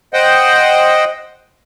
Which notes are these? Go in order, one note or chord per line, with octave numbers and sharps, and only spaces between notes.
C5 D#5 F#5 G5